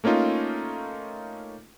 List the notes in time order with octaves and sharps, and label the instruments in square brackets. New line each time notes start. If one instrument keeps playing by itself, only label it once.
[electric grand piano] A3 A#3 C#4 D#4 F4